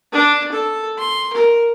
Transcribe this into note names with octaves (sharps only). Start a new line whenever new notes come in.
D4
A4
C6
A#4